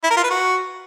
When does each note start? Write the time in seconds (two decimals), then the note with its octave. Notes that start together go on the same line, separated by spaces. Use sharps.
0.04 E4
0.10 A#4
0.17 F4
0.24 B4
0.30 F#4